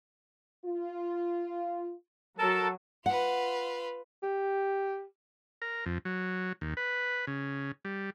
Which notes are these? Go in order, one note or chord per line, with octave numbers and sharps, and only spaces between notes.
F4
F#3 A4 A#4 A5
F4 B4 F#5
G4
A#4
F2
F#3
D#2
B4
C#3
G3